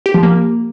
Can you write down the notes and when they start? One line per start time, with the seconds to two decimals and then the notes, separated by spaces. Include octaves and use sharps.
0.06 G4
0.14 F3
0.23 A#3